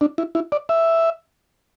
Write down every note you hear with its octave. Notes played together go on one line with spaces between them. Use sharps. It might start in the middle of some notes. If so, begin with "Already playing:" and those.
D4
E4
E4
D5
E5